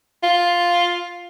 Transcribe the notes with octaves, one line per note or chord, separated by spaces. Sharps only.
F4